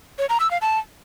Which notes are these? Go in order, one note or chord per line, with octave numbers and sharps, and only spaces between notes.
C#5
A#5
E6
F5
A5